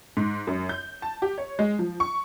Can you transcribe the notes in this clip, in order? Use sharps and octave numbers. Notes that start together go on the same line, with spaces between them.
G#2
F#2
G6
A5
G4
C#5
G#3
F3
C#6